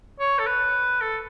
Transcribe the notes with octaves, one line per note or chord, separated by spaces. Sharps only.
C#5
A4
B4
A4